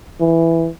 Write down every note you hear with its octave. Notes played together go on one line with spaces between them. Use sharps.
E3